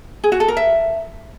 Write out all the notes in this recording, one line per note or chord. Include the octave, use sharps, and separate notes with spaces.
G#4
F#4
A4
A#4
E5